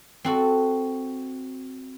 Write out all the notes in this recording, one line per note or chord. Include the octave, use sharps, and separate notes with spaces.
C4 F#4 A4